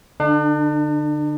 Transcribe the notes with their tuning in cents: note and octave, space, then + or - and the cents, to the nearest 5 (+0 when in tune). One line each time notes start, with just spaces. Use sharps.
D3 +0 D4 +40